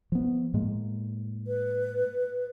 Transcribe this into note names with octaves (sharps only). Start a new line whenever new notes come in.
F3 B3
A2 G#3 A#3
B4